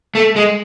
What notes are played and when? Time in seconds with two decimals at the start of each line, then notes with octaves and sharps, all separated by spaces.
0.15 A3
0.36 G#3